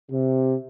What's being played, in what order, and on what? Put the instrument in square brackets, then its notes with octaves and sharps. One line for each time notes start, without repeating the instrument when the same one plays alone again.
[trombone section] C3